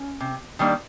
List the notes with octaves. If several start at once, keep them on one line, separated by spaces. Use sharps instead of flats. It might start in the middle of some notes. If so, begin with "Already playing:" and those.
Already playing: C#4
C3
D#3 G3 A#3 D4